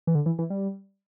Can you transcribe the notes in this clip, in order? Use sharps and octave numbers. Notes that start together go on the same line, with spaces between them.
E3
D3
E3
E3
G3